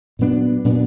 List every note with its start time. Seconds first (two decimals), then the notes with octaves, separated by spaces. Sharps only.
0.19 A#2 F#3 B3 D4
0.64 A#2 F#3 B3 D4